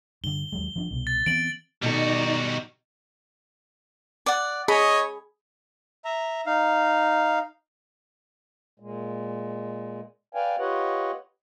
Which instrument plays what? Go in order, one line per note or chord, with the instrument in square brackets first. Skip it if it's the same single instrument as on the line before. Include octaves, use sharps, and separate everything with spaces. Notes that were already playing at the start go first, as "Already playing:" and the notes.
[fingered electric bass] G2 D3 [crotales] G7
[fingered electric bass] D#2 F#3 G#3
F3 C4 D4
C2 B2
[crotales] A6
[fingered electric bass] E3 B3 C4 [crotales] D7 F#7
[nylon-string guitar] B2 D#3 A4 [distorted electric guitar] G3 F#4 [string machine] D#4 D5 A#5
[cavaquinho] D5 F#5
[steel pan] G#4 [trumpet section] C#5 D#5 [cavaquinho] B5
[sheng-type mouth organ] E5 A#5
D#4 F5
[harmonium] A#2 G#3
B4 D5 F5 G5 G#5
F4 G4 B4 C#5 D#5 F#5